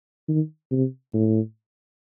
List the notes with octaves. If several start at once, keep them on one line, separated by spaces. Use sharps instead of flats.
D#3
C3
A2